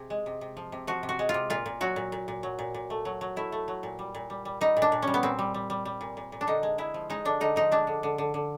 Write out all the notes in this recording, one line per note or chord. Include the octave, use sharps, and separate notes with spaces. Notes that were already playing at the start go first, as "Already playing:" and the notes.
Already playing: C3 G#4
G#3
C3
C3
F3
C3
F3 F#4
C3
F#4
G#3
F4
C3
A#2 F4
A#2
F#3 F#4
A#2
A#2
A#2
F#3
A#2
A#2
A3
F#3
F#3
A3 E4
A3
F#3
A#2
G3
A#2
G3
G3
G3 D#4
A#2
D4
A#2
G3 C#4
B3
A#2 C4
G3
G3
G3
G3
A#2
A#2
A#2
D4
D3 D#4
G#3
G#3 E4
F3
G#3 D#4
D3 D4
D3 D#4
F3 D#4
G#3 D4
D3
D3
D3
D3